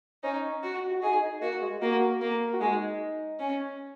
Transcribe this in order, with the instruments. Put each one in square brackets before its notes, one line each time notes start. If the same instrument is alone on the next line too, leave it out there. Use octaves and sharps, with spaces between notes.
[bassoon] C#4 [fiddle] D#4
[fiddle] F#4
[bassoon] F#4
[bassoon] D#4 [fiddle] G#4
[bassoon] D#4
[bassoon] A#3 [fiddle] F#4
[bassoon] G#3
[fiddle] A#3 [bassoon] F#4
[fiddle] A#3
[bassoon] F#4
[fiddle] G#3 [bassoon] D#4
[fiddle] C#4